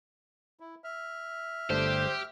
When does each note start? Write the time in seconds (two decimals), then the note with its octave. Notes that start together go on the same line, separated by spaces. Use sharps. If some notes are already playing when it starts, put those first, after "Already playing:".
0.60 E4
0.84 E5 F6
1.70 G1 A3 D4 G4 C5